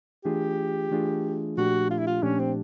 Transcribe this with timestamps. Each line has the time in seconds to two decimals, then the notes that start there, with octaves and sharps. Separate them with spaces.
0.24 E3 A3 D4 F4 G4 G#4
0.91 E3 A3 D4 F4 G#4
1.57 A#2 F3 A3 D4 F#4 G4
1.91 F4
1.98 E4
2.07 F4
2.23 A#2 F3 A3 C#4 D4 G4
2.39 C4